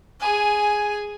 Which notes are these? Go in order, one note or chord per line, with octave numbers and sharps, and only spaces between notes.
G#4 G#5